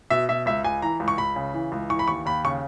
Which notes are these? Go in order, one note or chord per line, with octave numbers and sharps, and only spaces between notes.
B2 E5
B2 E5
C#2 E5
C#2 G#5
E3 A#5
C#2
C#6
C#2 B5
C#3
E3
C#2
E3 C#6
B5
D#2 C#6
D#2 B5
C#3 C#6